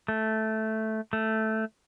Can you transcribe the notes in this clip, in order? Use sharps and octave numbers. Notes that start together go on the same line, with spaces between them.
A3
A3